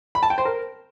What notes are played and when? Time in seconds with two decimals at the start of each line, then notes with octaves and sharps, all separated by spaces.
0.15 B5
0.23 A5
0.30 G5
0.38 C5
0.45 A#4